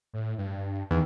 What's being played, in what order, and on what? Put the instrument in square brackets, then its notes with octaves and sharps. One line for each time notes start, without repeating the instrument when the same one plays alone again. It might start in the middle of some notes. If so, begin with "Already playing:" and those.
[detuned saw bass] A2
G2
[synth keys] E2 [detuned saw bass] D#3